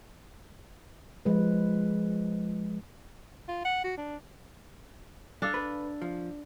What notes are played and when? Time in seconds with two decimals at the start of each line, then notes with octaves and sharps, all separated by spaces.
1.25 F3 G#3 B4
3.48 F4
3.65 F#5
3.84 F#4
3.98 D4
5.42 D4 A4 F5
5.54 B4
6.02 F3